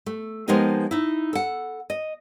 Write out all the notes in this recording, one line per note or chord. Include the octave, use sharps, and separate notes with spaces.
A3
F3 G#3 A#3 B3 D#4 G4
D#4 E4
A4 F#5
D#5